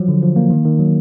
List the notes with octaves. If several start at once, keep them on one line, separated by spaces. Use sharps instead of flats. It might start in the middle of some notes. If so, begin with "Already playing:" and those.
Already playing: F3 F#3
D3
F3
A#3
D#3
D#3
F#3